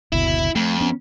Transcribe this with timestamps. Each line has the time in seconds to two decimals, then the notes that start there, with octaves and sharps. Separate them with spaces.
0.12 F#1 D2 B2 E4
0.56 F2 A3
0.81 B3 C#4